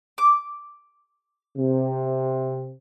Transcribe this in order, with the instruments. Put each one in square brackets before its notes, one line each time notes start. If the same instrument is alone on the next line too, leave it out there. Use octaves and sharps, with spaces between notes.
[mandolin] D6
[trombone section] C3